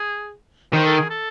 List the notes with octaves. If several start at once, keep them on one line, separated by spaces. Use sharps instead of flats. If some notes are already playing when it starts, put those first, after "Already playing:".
Already playing: G#4
D#3 C5
A4
G#4
A4